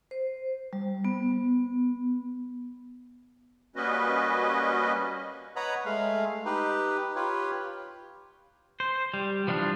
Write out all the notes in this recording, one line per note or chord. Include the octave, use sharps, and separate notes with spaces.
C5
G3
B3
G3 A#3 C#4 F#4 B4 D#5
B4 C#5 D#5 F#5 A#5 B5
G#3 A3 F5
D#4 G4 B4
F4 G4 B4 C#5
C5
G3
E3 F3 G3 D4 F4